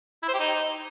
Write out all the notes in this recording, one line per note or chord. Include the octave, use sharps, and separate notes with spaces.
E4
C5
G4
D#4